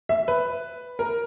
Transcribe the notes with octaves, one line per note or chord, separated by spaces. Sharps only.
E5
B4
A#4